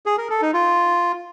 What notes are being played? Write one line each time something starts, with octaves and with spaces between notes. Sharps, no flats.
G#4
A#4
A4
D#4
F4